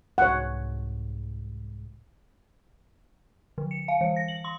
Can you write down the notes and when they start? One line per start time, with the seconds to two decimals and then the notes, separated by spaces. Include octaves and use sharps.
0.18 C2 G#2 C#5 F#5
3.58 D3
3.71 C#7
3.88 F5
4.01 E3
4.16 A#6
4.28 F#7
4.44 C6